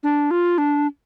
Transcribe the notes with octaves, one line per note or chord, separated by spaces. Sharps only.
D4
F4
D4